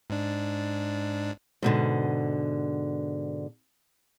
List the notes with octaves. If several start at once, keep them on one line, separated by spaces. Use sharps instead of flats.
G#2 D4
G#2 B2 D3